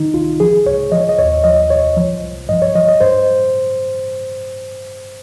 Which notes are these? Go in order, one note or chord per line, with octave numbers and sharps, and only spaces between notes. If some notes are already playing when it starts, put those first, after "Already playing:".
Already playing: D#3 D#4
C2 F4
F3 G#4
C#2 C#5
F3 D#5
C#5
D#5
D#2 C#5
F3 D#5
C2 C#5
F3
C2
G2 D#5
C#5
F3 D#5
D#5
G2 C5